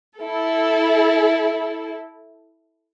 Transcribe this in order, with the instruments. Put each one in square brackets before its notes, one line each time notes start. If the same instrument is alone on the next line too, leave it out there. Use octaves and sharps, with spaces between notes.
[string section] E4 A4